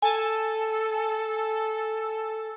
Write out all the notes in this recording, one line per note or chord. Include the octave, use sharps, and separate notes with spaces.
A4 G#5 A5